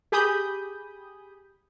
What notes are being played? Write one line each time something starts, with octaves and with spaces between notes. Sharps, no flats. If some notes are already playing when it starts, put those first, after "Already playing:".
G4 G#4 G#5 B5 D#6 G6